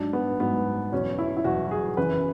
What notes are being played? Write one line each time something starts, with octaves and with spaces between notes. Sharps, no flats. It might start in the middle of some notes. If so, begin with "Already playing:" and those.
Already playing: G#2 F#3 D4
B3
G#2 F#3 B3
E2 B2 F#3 C#4
E4
E4
E2 B2 F#3 F#4
G#4
F#2 C#3 E3 B4